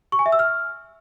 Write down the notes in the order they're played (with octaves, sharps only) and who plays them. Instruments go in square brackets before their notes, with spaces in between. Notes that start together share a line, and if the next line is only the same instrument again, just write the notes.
[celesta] C#6
G#5
E5
E6
F6